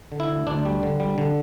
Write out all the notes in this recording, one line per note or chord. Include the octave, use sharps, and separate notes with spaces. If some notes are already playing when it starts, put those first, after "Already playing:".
D3
E4
D2
D2 D4
G3
D3
G3
D3